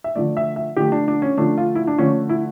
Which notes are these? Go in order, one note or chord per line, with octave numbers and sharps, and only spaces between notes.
E5
D3 F3 A3 D5
E5
E5
D3 F3 A3 G4
D4
D4
C#4
D3 F3 A3 D4
F4
E4
D4
D3 F3 A3 C#4
E4